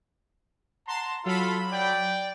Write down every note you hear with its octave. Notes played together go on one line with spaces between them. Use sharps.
F#5 A5 A#5 C6
F#3 F4 A4 B5
D5 G5